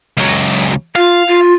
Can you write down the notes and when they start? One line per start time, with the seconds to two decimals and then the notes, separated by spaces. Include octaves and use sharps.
0.17 C#2 F#3
0.96 F4 F5
1.28 F4